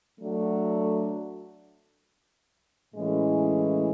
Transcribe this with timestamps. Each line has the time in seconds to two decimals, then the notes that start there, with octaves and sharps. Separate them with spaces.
0.20 F#3 A3 D4 F#4
2.95 A2 E3 G#3 C#4